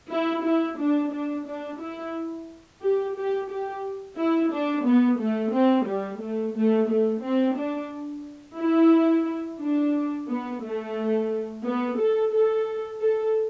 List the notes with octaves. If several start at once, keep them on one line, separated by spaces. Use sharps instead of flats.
E4
E4
D4
D4
D4
E4
G4
G4
G4
E4
D4
B3
A3
C4
G3
A3
A3
A3
C4
D4
E4
D4
B3
A3
B3
A4
A4
A4